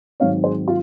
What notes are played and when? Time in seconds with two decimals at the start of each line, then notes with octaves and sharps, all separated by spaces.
0.20 G#2 D#3 F#3 C4 C#5 F5
0.44 G#4 C5
0.68 F4